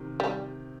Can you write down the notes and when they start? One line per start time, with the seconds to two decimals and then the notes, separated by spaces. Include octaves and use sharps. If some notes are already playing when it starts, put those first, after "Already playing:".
Already playing: C3 D#3
0.20 G3